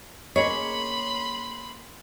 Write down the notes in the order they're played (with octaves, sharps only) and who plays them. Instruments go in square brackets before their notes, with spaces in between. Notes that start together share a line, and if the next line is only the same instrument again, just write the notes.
[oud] A#3 C#4 G#4 [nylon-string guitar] C#5 [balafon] D#5 [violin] B5 C6